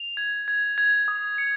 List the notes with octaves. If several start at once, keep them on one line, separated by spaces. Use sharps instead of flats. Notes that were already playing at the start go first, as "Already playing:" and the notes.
Already playing: F7
G#6
G#6
G#6
D#6
C#7